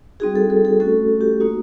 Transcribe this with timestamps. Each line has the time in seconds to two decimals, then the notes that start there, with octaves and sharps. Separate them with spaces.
0.20 G3 C4 D#4 F#4 G#4
0.36 A4
0.50 A4
0.65 A4
0.80 A3 C#4 F#4 A4
1.21 G4
1.40 A#3 D#4 F#4